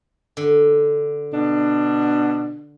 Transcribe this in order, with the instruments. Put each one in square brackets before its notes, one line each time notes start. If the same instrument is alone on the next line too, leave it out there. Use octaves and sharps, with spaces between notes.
[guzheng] D3
[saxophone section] B2 D4